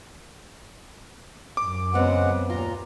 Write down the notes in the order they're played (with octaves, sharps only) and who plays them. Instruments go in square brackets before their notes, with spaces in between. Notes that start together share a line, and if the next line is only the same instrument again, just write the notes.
[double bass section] F#2 [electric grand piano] D6
[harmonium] C#3 G#3 F#5 [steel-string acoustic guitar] B3 C4
[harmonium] D#2 A#2 A#5 [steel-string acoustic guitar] F4